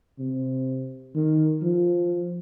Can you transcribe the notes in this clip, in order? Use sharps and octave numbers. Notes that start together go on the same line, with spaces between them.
C3
D#3
F3